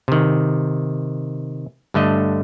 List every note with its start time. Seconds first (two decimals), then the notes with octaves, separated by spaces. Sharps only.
0.08 C3 D#3
1.94 G2 D3 A3 D#5